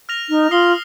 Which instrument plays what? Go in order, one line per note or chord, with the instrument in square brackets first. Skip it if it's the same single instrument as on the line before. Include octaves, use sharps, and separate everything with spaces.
[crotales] F6 A#6 F7
[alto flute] D#4
[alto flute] F4 [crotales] D#6 C7 G7